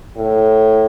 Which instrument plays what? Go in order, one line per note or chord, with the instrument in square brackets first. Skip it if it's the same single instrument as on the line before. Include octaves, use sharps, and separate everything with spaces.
[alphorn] A2